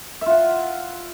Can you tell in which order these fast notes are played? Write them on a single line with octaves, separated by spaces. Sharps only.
E5 F4 F#5